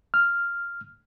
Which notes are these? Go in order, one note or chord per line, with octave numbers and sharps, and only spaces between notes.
F6